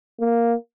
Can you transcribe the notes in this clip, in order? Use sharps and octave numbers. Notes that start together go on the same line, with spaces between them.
A#3